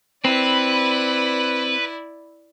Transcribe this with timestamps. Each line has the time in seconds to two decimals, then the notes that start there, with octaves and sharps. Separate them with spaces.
0.25 C4 E4 B4 D5